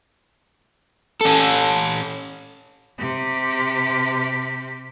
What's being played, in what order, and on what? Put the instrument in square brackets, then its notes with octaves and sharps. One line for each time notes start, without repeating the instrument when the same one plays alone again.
[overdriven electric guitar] C#4 A4
[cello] C3 G4